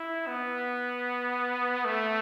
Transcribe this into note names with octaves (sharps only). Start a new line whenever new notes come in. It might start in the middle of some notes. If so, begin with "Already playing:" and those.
Already playing: E4
B3
A3